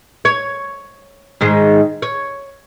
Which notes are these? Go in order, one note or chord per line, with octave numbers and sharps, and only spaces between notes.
C#5
G#2 D#3 G#3
C#5